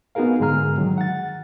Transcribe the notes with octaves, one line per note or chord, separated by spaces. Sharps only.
B3 D#4 F#4 G#4 A#4 F5
G#2 D3 G#3 G#4 A#5 F6
D#3 F#3
F#5 A6